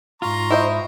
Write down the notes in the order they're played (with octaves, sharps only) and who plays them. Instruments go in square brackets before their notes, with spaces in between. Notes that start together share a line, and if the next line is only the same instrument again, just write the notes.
[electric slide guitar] G#2 F4 [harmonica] A#5 C6 C#6
[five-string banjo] E4 C5 D#5